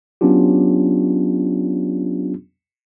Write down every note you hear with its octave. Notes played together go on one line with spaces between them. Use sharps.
F#3 B3 C#4 D4 F4 G4